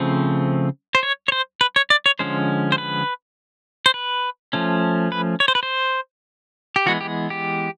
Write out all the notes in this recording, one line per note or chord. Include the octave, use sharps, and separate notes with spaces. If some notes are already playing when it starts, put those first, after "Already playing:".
Already playing: C#3 F3 A3 C4
C5
C#5
C#5
C5
B4
C#5
D5
C#5
D3 F3 G#3 C#4 C5
C5
B4
C5
B4
F3 A3 C#4
B4
C#5
C5
B4
C5
G4
E3 G#3 B3 F#4
G4
G4